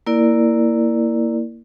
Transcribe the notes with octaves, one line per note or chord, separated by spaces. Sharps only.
A#3 E4 A#4 D5